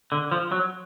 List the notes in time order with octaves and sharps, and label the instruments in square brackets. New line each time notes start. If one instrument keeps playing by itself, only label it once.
[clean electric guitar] D3
F3
F#3